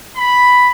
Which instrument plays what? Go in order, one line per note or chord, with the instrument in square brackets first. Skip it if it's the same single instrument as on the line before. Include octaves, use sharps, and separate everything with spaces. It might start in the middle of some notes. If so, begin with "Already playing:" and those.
[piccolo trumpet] B5